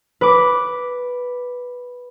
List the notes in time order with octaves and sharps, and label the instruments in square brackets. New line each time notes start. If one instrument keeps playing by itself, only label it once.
[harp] B4 D6